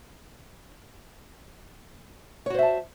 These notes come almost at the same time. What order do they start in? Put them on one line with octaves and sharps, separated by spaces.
C#5 F#4 C5 E5 A5